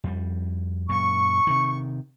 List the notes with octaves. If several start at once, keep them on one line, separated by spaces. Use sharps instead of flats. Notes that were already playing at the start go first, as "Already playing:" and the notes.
F2 G3
F#2 A#2 C#6
C3 D#3